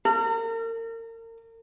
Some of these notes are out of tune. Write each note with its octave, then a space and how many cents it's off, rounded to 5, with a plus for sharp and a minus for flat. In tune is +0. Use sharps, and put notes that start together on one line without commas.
A#4 -35